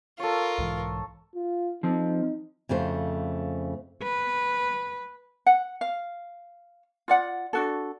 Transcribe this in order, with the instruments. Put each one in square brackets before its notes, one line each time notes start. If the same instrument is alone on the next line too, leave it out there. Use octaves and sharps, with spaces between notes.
[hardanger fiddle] F4 A#4 [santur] A4 C#5
[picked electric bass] B1 G#2 E3
[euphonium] F4
[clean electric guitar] F3 C4 [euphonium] D#4
[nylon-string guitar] F2 C#3 A3 C5
[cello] B4
[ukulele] F#5
F5
F4 D5 F#5
D4 F#4 A4